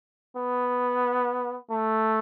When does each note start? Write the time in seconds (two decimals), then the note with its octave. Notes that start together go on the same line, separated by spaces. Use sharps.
0.37 B3
1.70 A3